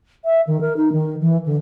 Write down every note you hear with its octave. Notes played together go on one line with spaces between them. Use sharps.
E5
D#3
A#4
D#4
D#3
E3
D3